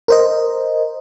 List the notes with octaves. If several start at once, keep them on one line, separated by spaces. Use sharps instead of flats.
A#4 C5 D#5